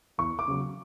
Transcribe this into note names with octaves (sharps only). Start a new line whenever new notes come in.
E2 C#6
D6
C#3 F#3